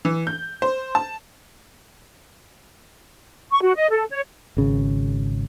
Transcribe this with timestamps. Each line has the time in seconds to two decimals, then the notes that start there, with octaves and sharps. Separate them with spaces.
0.05 E3
0.27 G6
0.62 C5
0.95 A5
3.51 C#6
3.62 F#4
3.76 D#5
3.90 A4
4.10 C#5
4.57 G#1 C#3